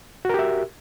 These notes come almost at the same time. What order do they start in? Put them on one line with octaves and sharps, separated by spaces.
F#4 A#4 G4 E5